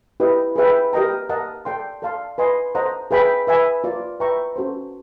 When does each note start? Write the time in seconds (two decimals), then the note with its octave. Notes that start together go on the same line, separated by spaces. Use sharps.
0.20 E4 G4 B4 D#5 G5
0.56 G#4 B4 E5 G5
0.93 G4 A#4 D#5 G5 A#5
1.29 A#4 D#5 F#5 A5
1.65 A4 D5 G5 C6
2.02 A4 D5 F5 A5 C6
2.38 B4 D#5 G#5 C6
2.75 A4 C5 D#5 F#5 A#5
3.11 G#4 B4 E5 G5 B5
3.47 B4 E5 G#5
3.84 F4 A#4 D5
4.20 B4 E5 G5 A#5 C#6
4.56 C#4 F#4 A4 C5